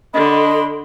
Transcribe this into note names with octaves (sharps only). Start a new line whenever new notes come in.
D3 D#5 B5 C6